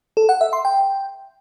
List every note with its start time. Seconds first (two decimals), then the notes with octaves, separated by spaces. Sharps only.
0.17 A4
0.29 F#5
0.41 E5
0.53 C6
0.65 G5